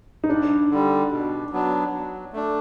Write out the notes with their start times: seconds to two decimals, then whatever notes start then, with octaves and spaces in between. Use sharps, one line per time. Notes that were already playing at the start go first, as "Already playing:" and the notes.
0.24 D#4
0.29 G2 D4
0.71 D3 G3
1.12 B2
1.52 F#3 B3 D4
1.92 F#3
2.33 A3 D4